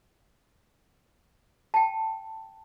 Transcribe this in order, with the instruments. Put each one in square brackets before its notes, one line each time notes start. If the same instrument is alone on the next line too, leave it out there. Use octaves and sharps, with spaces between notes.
[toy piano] G5 A5